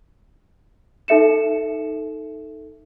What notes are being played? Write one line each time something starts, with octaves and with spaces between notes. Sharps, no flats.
D#4 A4 E5 C#7 E7